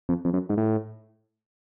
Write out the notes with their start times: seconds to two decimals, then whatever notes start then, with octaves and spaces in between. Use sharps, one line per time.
0.09 F2
0.25 F2
0.33 F#2
0.49 G#2
0.57 A2